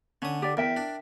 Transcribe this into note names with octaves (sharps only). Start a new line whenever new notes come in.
D3 C#4 D#6
G4 D5
E2 A#4 E5 G5
D4